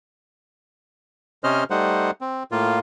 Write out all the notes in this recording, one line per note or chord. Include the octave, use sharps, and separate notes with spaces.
C3 C#4 C5 D#5 F6
G3 A3 D#4 C5 F#5
C4
A2 A#3 F4